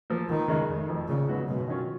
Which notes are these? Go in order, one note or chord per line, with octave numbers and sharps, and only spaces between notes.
F3 A#3
C#2 D#3
C#3 G#3 D#4 A#4
F1
F2 F3
A#1 C#3
G#2 F#3 B3 F#4
F#2 B2
D#3 F#3 C#4 F4